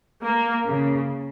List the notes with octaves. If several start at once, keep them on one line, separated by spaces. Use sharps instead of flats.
A#3
C#3